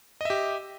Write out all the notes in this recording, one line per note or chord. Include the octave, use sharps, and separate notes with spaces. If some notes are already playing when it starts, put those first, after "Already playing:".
G4 D#5 E5